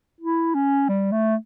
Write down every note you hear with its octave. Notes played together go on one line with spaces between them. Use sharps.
E4
C#4
G3
A3